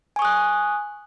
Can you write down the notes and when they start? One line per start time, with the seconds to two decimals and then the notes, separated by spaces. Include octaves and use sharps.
0.16 G#5
0.19 C#6
0.22 D#6
0.25 F#6